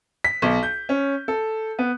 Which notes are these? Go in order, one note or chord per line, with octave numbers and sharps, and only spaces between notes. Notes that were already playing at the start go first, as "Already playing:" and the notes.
B6
B1
G6
C#4
A4
B3